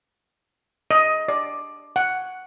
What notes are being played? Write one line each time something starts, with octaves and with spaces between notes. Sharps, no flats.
D#5
D5
F#5